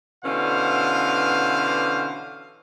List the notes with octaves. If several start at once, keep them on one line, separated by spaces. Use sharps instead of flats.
B2 D3 E3 C#4 C5 F5